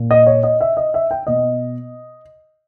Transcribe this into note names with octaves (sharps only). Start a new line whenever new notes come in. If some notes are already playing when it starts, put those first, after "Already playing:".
Already playing: A#2
D#5
C#5
D#5
E5
D#5
E5
G5
B2 D#5